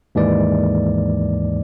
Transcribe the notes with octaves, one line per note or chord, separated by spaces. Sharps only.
D#2 G#2 E3 G#3 D5